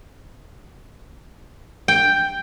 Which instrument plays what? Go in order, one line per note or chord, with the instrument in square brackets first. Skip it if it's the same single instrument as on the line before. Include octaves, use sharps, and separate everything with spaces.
[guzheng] G5